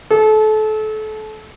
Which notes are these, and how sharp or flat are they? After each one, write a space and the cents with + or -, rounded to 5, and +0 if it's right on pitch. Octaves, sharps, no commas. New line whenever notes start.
A4 -30